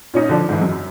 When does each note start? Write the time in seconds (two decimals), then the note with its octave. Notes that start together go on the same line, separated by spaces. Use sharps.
0.14 A#2 C#4 D#4
0.29 D3 F3 D4
0.49 G#2 E3
0.61 F#2